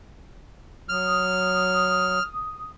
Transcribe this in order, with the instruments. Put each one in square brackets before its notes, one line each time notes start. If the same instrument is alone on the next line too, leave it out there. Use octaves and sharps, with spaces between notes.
[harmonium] F#3 [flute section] D#6 [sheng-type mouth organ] F6